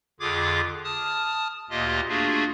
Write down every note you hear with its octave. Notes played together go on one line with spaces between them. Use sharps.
F2 D3 F4 G#4 D6 G#6
A5 D#6 F6
D2 A#2 A#3 F4 G4 D#5
A3 A#3 D4 F4 F#4 G#4